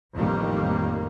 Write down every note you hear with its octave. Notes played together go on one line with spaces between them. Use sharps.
A1 F2 D#3 G3 A#3